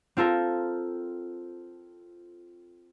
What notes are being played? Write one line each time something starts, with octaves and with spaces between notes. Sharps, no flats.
C4 F4 A4 A#4